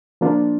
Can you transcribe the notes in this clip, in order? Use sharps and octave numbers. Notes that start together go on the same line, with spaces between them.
F3 A#3 D4 F4